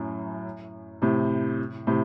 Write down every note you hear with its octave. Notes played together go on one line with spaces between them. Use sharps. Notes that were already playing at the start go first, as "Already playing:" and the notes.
Already playing: F#2 A2
A2 C3
A2 C3